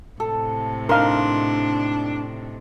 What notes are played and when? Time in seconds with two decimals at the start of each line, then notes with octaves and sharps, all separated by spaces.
0.20 A2 C3 A4
0.89 D4 D#4 A#4 F5 C6